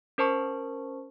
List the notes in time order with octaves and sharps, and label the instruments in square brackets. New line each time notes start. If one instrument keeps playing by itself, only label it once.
[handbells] C#4 A#4 C5 A5 C#6